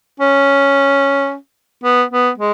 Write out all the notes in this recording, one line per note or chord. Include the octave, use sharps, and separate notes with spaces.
C#4
B3
B3
G#3